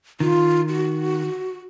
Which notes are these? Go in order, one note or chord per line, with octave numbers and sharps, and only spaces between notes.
D#3 F4
F#4